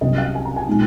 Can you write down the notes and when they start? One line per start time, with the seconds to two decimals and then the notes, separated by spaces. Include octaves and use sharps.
0.01 C2 C3 F#3 C#4 D#5
0.18 F5
0.35 G#5
0.45 A#5
0.56 G#5
0.67 A#2 G#3 D#4